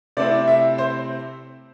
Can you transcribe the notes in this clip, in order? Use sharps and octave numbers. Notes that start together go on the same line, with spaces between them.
C3 A3 C4 E4 D5
E5
C5